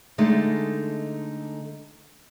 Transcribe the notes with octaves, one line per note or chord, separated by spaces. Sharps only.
D3 G#3 A3 D#4